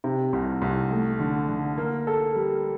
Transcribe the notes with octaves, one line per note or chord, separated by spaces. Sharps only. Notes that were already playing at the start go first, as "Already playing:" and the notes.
C3
C2
C2
A3
D3
D3
A#3
A4
G3